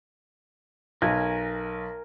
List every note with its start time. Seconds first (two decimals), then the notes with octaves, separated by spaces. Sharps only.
1.02 B1 A#4 G#5